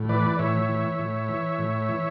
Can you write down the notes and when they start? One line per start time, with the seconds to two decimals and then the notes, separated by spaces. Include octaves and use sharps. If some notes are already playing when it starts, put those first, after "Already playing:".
Already playing: A2
0.09 E3 B4 D5
0.39 A2 C#5 E5
0.69 E3
0.98 A2
1.29 E3
1.59 A2
1.89 E3